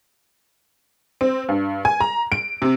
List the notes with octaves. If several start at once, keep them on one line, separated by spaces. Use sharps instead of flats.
C4
G2
G#5
A#5
D7
C3